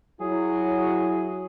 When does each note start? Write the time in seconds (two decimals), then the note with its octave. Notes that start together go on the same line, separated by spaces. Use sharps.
0.21 F#3 E4 G#4